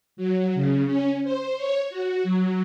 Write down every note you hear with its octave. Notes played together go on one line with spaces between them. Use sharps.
F#3
C#3
C#4
C5
C#5
F#4
F#3